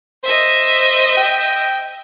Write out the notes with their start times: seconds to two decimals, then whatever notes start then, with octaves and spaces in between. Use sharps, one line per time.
0.24 C5 D#5 E5
1.17 G5